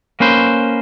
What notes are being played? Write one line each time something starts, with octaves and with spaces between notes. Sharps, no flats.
A#3 C#4 B4 C5